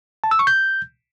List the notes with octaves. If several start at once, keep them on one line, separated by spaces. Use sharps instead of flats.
A5
E6
C#6
G6